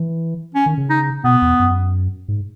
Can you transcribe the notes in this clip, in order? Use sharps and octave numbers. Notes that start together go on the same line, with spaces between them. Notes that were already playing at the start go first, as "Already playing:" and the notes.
Already playing: E3
C#4
D#3
C#3
D#4
B2 B3
E2
F#2
G#2